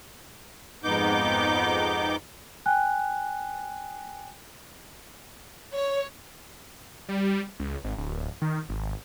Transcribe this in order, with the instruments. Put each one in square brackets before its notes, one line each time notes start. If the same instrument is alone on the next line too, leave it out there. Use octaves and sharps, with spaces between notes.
[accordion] F2 G#2 B3 D#4 D6 G6
[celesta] G5 G#5 F#6
[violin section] C#5
[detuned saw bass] G3
C#2
G#1
D1
D#3
G#1